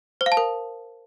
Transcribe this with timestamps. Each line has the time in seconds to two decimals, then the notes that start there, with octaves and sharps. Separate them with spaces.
0.21 C5
0.26 F5
0.32 A5
0.37 A#4